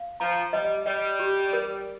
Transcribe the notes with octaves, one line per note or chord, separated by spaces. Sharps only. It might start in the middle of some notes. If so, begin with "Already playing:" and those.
Already playing: F5
F3 A#5
G3 D#5
G3 D#5
G4
A#4